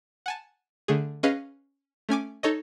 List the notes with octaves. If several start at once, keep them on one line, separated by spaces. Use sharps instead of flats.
F#5 G#5 A5
D3 A3 G#4
C#4 G#4 B4 D#5 F5
A3 C#4 G#5 D6
D#4 A4 C#5 D#5